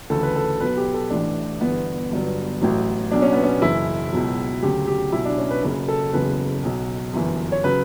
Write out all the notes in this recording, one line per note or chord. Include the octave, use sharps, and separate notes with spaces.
D2 C#3 E3 A4
B4
A4
B1 B2 F#3 B4
G4
A4
A1 A2 E3 D4
G1 G2 E3 B3
G1 G2 F#3
A1 A2 F#3
B1 B2 F#3 D4
C#4
B3
C#4
F#1 F#2 E3 E4
C#2 B2 F#3
D2 C#3 F#3 G4
G4
B1 B2 F#3 E4
D4
C#4
B4
F#1 F#2 C#3 B4
A4
F#1 E2 C#3 F#3 B4
B1 B2 F#3
G1 F#2 E3
C#5
C#3 F#3 B4